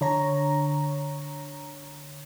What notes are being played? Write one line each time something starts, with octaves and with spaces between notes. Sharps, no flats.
D3 C#5 A#5